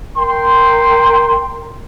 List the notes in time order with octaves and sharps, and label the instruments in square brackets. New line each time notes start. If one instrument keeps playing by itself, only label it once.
[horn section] A#4 G5 C6